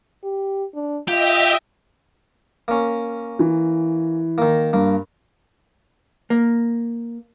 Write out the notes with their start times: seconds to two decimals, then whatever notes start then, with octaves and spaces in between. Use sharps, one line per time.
0.23 G4
0.74 D4
1.08 F4 G4 D#5 E5 G5
2.68 A#3 C#4
3.39 E3
4.38 D#3 A#3
4.73 G2 A#3
6.30 A#3